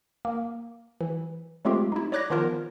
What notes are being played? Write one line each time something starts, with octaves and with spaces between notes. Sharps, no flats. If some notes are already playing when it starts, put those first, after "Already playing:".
A#3
E3
F#3 G#3 A3 C4 F4 G4
D#4 E4
C#5 D5 D6 F#6 G#6 A#6
D#3 F3 B3 F4 A#4 C5